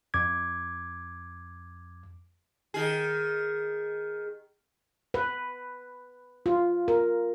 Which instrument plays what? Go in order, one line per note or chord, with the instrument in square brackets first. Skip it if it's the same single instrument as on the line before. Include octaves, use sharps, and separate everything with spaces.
[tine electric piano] F2 D6 G#6
[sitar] D#3 G#4
[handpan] B4
F4
A#4